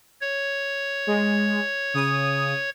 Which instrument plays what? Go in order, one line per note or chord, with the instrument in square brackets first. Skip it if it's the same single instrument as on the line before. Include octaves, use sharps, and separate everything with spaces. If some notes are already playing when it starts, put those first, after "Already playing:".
[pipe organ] C#5
[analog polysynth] G#3
C#3 D#6